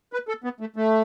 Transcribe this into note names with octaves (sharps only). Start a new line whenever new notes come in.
B4
A4
B3
A3
A3